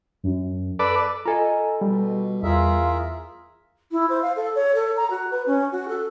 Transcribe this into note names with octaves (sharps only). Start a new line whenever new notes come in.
F#2
A4 B4 D5
F4 A4 D#5 G#5 A#5
B2 G3
E2 F4 G#4 A#4 E5
E4
C5
F5
A4
C#5
A4
A#5
F#4
B4
C#4
F#4
A4